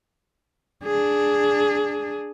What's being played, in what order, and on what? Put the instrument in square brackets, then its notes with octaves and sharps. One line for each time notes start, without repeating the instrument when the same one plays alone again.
[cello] D4 G#4